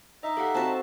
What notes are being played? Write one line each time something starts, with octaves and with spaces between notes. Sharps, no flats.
D#4 D#5 E5
G4 A4 F5 F#5
C4 F#4 A5